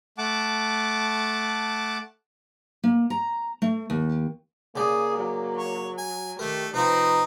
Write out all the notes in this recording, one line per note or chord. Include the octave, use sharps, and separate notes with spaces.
A3 F#5 A5 D6
A#3
A#5
A3
D#2
C#3 A#3 G#4 D5
F#3
C#5
G#5
D#3 A3 G4 A#4
C3 F3 C4 D#4 F4 B4